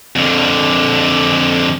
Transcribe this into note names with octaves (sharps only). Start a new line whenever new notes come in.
F2 D3